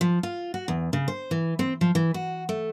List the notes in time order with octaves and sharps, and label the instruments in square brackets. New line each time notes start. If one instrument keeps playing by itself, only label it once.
[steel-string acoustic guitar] F3
F4
F#4
E2
C#3
C5
E3
C4
F3
E3
F#4
A3